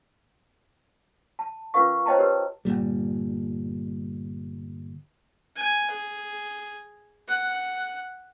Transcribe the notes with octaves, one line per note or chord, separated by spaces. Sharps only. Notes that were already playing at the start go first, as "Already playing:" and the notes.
A5
C#4 F4 A#4 B4 F5 C#6
C5 C#5 D#5 G5 A5 A#5
G4 A#4 B4
G1 C2 A#2 G3
G#5
G#4
F#5